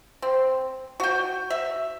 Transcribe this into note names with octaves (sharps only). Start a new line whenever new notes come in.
C4
F#4 G5
E5